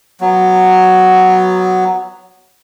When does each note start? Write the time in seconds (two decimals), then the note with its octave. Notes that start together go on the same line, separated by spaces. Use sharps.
0.21 F#3 B3